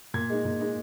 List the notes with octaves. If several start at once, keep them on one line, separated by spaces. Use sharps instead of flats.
A#2 G#6
G#3 D#4
A#2
G#3 D#4